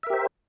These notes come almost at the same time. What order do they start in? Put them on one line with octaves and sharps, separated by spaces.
E5 A#4 G4 C5